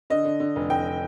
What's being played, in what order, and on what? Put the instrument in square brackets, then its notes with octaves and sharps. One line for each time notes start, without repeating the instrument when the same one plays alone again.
[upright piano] D3 D#5
D3
D3
F1
F1 G5